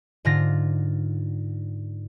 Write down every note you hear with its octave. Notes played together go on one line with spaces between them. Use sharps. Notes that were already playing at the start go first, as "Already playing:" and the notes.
G#2 D3 F4 A#6